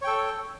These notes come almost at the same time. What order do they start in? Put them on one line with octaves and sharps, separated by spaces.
C#5 G5 A4